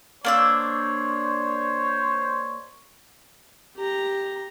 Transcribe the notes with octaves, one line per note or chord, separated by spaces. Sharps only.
A#3 D4 C5 C#5 E6
G4 A#5